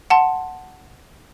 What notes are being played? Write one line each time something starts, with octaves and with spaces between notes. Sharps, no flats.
F#5 A5 C6